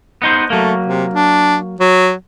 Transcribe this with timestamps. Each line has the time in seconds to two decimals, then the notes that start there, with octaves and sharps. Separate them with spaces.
0.22 B3 D#4 C5
0.50 F#3 A3 A#3
0.86 C3
1.14 D4
1.80 F#3